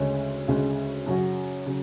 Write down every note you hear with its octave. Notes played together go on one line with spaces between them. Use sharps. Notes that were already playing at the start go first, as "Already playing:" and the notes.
Already playing: D2 C#3 G#3 C#4
D2 C#3 G#3 C#4
F#2 C#3 F#3 C#4 F#4
C#3 F#3